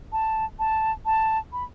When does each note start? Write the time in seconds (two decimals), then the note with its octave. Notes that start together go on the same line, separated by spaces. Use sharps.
0.12 A5
0.59 A5
1.06 A5
1.53 B5